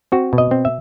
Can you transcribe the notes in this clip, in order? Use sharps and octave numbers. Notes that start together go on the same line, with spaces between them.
C4 F#4
B2
D#5
C4
E5